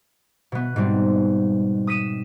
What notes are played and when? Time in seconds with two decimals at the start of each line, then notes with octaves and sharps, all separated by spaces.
0.52 B2 B3
0.76 G#2 B2 G3 C4
1.87 D#6 B6 D#7 E7